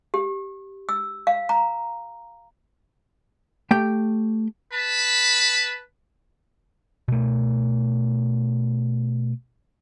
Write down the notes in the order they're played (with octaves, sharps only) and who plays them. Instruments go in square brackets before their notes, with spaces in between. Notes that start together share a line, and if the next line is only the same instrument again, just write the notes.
[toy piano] G4
E6
F5
A#5
[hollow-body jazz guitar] A3 G4 G5
[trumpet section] B4 A5 B5
[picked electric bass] B2 A3